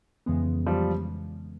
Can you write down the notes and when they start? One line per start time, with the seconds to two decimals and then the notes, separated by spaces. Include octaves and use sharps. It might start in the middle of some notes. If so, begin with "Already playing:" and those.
0.26 F2 C#3 E3 G#3 B3
0.66 F3 G3